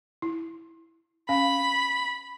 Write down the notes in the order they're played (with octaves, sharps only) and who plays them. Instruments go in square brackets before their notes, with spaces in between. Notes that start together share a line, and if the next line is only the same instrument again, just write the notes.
[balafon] E4
[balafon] C#4 F5 G#5 [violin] B5